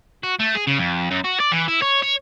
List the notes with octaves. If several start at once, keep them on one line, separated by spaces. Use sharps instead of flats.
F#4
A3
G#4
C#3
F2
F#2
F#4
D5
E3
E4
C#5
C#5